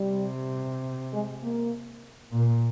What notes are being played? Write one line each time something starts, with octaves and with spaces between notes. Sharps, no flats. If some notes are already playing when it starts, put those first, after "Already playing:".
Already playing: C3 G3
G#3
A#3
A#2 A#3